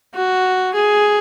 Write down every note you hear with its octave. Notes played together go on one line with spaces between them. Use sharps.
F#4
G#4